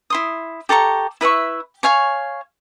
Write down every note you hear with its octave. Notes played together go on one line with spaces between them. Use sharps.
E4 C6 D#6
G4 A4 A#5 C#6
E4 B4 E5 C#6
C#5 F5 G#5 C#6